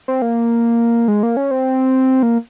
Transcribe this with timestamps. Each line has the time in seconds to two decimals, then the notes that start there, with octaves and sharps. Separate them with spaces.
0.08 C4
0.22 A#3
1.08 G#3
1.23 A#3
1.37 C#4
1.51 C4
2.23 A#3